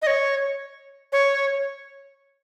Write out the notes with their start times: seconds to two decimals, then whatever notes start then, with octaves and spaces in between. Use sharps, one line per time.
0.02 D#5
0.07 C#5
1.12 C#5